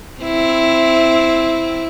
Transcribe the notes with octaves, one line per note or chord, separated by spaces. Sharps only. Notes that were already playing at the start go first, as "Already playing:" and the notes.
C4 E4